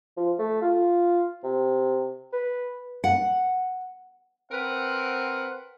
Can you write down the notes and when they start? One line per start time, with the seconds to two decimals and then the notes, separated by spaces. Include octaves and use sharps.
0.17 F3
0.39 A3
0.62 F4
1.44 C3
2.33 B4
3.04 F#5
4.51 C4 A#4 B4 F#5